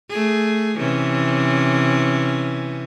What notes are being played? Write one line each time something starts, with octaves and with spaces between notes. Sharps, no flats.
A3 G#4
C3 E3 C#4